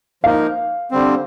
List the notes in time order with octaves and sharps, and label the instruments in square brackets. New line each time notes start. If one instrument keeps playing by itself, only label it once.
[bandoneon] F3 A#3 D#4 A#4 [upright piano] F5
[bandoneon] D3 G3 C4